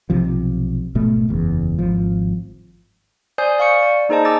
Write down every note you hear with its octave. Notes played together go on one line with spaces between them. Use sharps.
B1 C3 F3
G#1 B2 A3
F#1 E2
G#1 F3
C5 D5 G#5 D#6 G6 C7
D5 F5 C#6 C#7
D5
A#3 D#4 G#4 C5 D#5 A5
G#5 A#5 D6 E6 A6